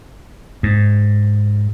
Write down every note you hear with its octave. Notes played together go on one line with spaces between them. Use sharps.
G#2